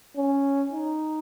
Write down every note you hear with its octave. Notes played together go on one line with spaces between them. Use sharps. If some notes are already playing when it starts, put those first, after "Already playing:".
C#4
D#4